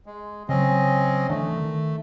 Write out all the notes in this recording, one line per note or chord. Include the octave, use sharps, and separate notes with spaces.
G#3
C#3 F#3 C4 C#4 D#5
D3 E3 A3
D#3